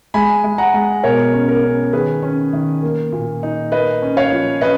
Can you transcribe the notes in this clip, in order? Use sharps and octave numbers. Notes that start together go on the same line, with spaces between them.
G#3 G#5 B5
G#3
F#5 A#5
G#3
B2 A#4 C#5
C#4
A#4
C#4
D#3 G#4 B4
C#4
D#3
A#3
A#2
D#4
A#3 B4 D#5
C#4
C#5 F5
F3
C#4 B4 D#5